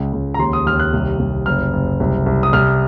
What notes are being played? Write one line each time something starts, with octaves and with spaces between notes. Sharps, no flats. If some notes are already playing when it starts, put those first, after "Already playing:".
Already playing: C#2
C#2
A#5
D#2 C6
D#6
D#2 F6
F#6
C2
C2
F#1 F6
F#1
C2
C2
D#6
C2 F6